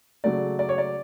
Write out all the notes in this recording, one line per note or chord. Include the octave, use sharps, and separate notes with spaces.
C#3 F#3 A3 D5
D5
C#5
D5